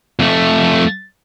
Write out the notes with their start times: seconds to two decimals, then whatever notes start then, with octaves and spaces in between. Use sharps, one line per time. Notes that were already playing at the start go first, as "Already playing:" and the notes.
0.19 F2 A3